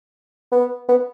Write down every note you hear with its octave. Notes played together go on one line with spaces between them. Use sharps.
B3
B3